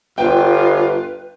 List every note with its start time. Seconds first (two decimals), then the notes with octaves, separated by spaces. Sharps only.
0.18 G1 F4 B4 G5